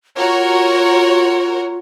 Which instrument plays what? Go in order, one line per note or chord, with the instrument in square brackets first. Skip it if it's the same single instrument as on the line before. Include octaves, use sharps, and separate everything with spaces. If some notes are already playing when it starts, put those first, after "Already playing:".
[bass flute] F4 [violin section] F#4 A#4 C#5